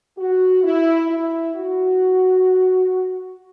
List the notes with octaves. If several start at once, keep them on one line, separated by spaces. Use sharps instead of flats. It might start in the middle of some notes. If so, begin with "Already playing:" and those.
F#4
E4
E4
F#4